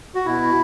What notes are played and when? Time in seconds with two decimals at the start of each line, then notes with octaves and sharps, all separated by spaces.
0.15 F#4
0.26 B2 E4